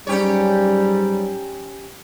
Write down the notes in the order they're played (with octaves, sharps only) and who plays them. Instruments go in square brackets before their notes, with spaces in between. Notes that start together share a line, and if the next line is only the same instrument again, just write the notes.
[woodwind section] G#2 F#3 G3 [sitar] C#4 G4 C#5